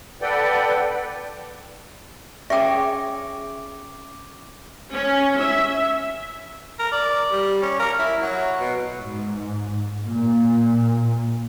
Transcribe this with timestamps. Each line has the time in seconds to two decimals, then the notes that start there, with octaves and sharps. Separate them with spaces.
0.21 A4 B4 D5 F#5 G5
2.50 C#4 G#4 E5 G5 C#6 D6
4.93 C#4
5.40 E5
6.79 A#4
6.92 D5
7.32 G3
7.62 C#4
7.80 A#4
7.99 E4
8.22 F#3
8.60 B2
8.98 G#2
10.06 A#2